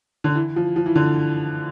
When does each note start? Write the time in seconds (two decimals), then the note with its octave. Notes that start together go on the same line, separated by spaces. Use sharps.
0.24 D3
0.35 E3
0.56 F3
0.76 F3
0.86 E3
0.95 D3